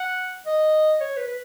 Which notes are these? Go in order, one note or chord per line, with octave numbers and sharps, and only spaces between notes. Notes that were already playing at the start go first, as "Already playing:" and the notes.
Already playing: F#5
D#5
C#5
B4
B4